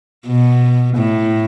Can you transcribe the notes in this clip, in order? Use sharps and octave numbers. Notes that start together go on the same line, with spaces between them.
B2
A2